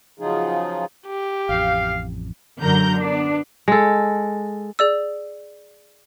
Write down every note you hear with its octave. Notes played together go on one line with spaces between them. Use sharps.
C#3 F3 F#3 D#4 F4 G#4
G4
A1 F2 F5
F#2 D3 F#3 A#4 A#5 G6
B3 D4
G#3 A4
G#4 D5 E6